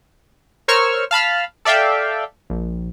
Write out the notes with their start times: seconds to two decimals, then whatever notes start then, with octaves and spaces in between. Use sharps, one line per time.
0.68 A#4 C5 C#5 C#6 E6 F6
1.11 F5 A5 B5 F6
1.65 A4 D5 E5 F5 G5
2.50 A#1